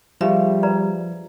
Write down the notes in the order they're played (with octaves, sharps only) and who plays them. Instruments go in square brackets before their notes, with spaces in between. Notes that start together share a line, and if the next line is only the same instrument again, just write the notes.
[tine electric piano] F3 [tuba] G3 [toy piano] D4 G4 G#4 [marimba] E5 F5
[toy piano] B4 D5 A#5